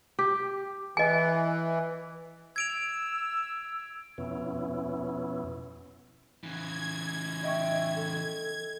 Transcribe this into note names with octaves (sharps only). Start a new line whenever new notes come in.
G4
E3 D#5 G#5
E6 G#6 D7 F7
F2 B2 B3 C#4 E4
C#3 E3 G#6
D#5 E5 G5 C#6
A4